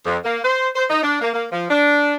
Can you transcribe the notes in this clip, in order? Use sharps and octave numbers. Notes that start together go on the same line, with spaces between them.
F2
A#3
C5
C5
D#4
D4
A#3
A#3
F3
D4